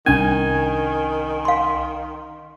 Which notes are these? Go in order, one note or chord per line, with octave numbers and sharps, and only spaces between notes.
C2 D#3 C#4 D4 G#5
F5 C6